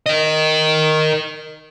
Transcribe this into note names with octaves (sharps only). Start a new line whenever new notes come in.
A#4 D#5